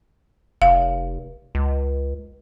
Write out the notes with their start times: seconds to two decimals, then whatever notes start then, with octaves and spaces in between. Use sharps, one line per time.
0.62 F1 F5
1.55 C#2